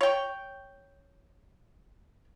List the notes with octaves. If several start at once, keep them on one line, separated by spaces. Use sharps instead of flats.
C#5 G5